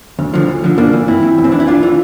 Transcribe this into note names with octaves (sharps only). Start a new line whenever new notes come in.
D2
D3 F3
D2
D3 F3
G2 A#3 D4
E3
G2 C4 E4
E3
E2
C4
E3 D4
E4
E2 D4 F4
E3